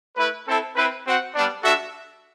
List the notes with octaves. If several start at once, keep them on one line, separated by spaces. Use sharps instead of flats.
A3 E4 B4
C4 E4 A4
C4 E4 B4
C4 F#4 C5 F#5
G3 B3 D4
G3 D4 F#4 A4 E5